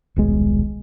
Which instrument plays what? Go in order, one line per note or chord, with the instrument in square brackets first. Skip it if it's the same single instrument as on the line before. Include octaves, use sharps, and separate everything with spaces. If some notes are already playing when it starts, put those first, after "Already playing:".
[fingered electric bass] D#1 B1 G#3